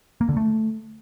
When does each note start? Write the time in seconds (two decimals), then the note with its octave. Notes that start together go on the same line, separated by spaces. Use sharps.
0.21 A#3
0.29 D3
0.37 A3